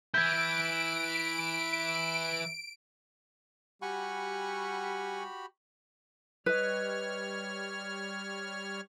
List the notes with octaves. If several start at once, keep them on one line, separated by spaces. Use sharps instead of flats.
E3 E4 G6 G#6 D7
G3 F#4 G4 F#5 G#5 B5 C#6
G3 B4 C#5 D#5 F6